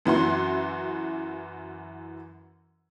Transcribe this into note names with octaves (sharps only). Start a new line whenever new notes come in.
F#2 E3 F#4 C6